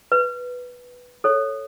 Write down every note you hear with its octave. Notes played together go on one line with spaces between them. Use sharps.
B4
A4 C#5